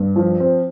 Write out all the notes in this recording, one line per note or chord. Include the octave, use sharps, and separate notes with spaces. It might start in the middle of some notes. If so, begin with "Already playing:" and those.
Already playing: G2
F3
C4